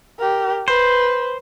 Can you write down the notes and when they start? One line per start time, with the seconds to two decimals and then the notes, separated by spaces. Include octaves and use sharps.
0.19 G4 A#4
0.68 B4 C5